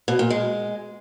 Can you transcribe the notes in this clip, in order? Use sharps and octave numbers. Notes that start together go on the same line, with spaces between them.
B2
A#2
G#3